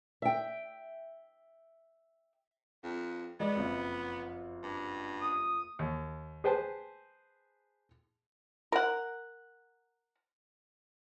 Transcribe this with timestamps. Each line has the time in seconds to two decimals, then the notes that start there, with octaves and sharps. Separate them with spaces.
0.22 E5 G5
2.84 F2
3.40 G#3 B3 D5 D#5
3.56 F#1 F2
4.63 G2
5.21 D#6
5.79 D#2
6.44 G#4 B4 C5 G5 A5
8.72 A#4 F#5